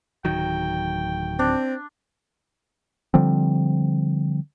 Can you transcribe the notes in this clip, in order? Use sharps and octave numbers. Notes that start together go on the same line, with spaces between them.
D1 D#3 F#3 G5
C4 D4
D3 F3 G3 C4